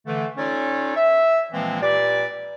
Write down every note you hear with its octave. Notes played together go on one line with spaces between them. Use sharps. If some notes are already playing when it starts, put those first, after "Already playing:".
D3 E3 A3
C#4 D#4 F4 A4 C#5 D5
E5
A#2 E3 F3 G#3 A#3 C4
A#2 G4 B4 D5